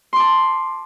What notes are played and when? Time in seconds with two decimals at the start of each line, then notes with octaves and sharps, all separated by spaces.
0.13 C6
0.16 D6
0.20 A5